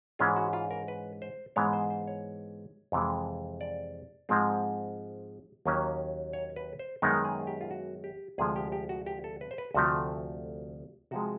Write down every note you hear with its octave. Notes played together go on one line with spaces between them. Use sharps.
G#2 E3 G#3 C#4 F4
F#4
F4
A#4
B4
C5
G#2 E3 G#3 B3 C#5
C5
C5
C#5
F2 C3 E3 G#3
D5
G#2 F3 G#3 C4
D#2 D#3 F#3 A#3 C#4
C#5
B4
C5
F#2 D#3 G#3 B3 D#4 A#4
G#4
G4
F4
F#4
G4
D2 C3 F3 G#3 G#4
G4
G4
F#4
G4
A4
B4
C5
B4
D2 C3 F3 A3 F#4
C3 F3 G#3 F#4